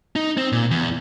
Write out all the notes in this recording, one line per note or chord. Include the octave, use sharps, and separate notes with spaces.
D#4
C4
A#2
E2